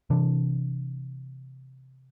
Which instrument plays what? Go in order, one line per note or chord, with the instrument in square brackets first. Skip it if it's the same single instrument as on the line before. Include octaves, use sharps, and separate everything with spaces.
[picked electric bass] C3 E3 D4